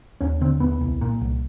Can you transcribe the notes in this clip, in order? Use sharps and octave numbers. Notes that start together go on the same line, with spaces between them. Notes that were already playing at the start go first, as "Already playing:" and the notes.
D#2 C#4
D3 C4
D#2 B3
C2
A#2
C2